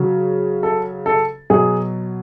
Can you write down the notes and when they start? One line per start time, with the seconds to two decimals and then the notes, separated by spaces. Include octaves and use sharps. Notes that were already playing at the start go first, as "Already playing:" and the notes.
Already playing: C#3 F#3
0.63 A4
1.06 A4
1.50 B2 F#3 G#4